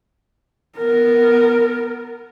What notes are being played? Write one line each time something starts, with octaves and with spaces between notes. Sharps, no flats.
B3 A#4